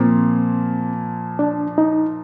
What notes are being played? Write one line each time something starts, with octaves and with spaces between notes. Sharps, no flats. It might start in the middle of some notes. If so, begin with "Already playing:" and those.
Already playing: A#2 F3 A#3 C4
D4
D#4